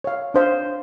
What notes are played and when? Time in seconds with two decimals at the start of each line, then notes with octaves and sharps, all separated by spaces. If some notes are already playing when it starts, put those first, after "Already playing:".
0.04 C#5 F5
0.34 D4 C5 F5